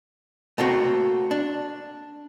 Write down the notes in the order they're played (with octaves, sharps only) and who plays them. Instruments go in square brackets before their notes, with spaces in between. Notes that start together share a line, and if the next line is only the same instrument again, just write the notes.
[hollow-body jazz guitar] A3 A#3 C4 F#4
D4